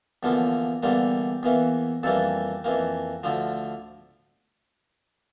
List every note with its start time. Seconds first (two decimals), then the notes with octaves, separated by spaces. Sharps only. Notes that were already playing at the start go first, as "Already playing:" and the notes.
0.23 E2 D3 F3 A#3
0.83 E2 D3 G3 A#3
1.43 E2 E3 A#3
2.03 F2 E3 G3 A#3 A4
2.64 F2 E3 A#3
3.23 D2 D3 F3